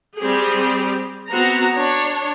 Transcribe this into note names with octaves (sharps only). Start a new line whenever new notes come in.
G3 C4 G4 G#4
B3 C4 F#4 A#5
D4 C#5